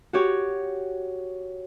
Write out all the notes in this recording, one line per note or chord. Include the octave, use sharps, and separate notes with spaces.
F#4 G4 C#5